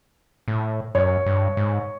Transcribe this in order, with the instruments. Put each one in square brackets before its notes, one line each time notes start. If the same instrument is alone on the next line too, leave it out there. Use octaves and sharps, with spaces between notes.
[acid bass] A2
[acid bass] F#2 [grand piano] C#5
[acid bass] G2
G#2